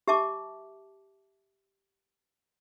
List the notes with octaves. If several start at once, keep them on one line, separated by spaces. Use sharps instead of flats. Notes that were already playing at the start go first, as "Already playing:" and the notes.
G4 E5 A5 D6